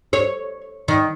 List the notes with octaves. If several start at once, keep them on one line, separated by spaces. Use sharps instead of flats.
C#5
D#3